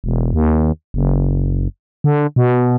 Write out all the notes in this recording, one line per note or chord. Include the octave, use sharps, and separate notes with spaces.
E1
D#2
F#1
D3
B2